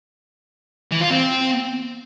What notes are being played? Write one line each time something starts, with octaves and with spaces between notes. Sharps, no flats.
E3
F4
C4